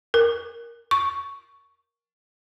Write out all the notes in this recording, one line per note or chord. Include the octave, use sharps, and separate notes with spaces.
A#4
C#6